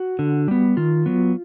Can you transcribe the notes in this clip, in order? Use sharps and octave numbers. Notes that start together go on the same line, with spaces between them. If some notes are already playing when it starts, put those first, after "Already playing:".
Already playing: F#4
D3
G3 B3
D#3 F4
F#3 B3